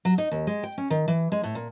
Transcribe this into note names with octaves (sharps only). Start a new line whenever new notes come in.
F#3
D#4
D#2
G#3
G5
C#4
D#3
E3
G#3
A2
A#2